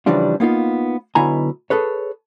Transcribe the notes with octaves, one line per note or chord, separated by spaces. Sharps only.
C#3 E3 F3 G3 D4 F4
A#3 B3 D#4 F4
B1 B2 D3 E4 G#5 A#5
G#4 A4 B4 C#5